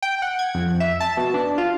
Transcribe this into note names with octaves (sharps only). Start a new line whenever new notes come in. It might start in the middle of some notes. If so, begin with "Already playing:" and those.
G5
F#5
G#6
F2
E5
A5
B2
D4
F4